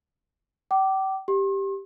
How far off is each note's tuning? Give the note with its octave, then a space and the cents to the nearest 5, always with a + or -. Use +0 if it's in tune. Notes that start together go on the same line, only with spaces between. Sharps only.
G5 -40 D6 +0
G4 +0 C6 +45